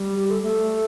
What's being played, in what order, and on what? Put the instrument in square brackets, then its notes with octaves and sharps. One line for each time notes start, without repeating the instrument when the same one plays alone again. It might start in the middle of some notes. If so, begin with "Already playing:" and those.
Already playing: [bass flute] G3
[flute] G4
A4
[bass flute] A3 [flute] A4